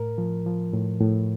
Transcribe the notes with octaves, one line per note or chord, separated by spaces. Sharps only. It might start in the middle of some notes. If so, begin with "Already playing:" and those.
Already playing: A2 A#4
F3
F3
A2
A2